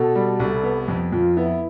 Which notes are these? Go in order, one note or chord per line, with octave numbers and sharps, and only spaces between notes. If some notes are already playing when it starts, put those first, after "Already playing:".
Already playing: B2 A4
G3
C2
B3
F2
F2 F4
B3 E4